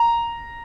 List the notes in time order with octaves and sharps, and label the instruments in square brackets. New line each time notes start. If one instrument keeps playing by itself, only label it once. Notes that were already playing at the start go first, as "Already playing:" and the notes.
Already playing: [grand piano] A#5